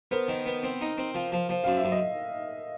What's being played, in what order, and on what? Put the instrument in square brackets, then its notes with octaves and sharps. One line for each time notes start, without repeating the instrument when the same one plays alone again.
[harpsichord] B3 [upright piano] A#4 C5
[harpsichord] D#3
B3
C4
D#4
C4
F3
F3
F3
[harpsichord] F#2 [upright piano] F5
[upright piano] E5
[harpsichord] F#2
[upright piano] D#5